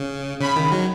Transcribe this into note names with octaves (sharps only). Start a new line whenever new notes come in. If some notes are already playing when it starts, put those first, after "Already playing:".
Already playing: C#3
C#3 B5
D#3
F#3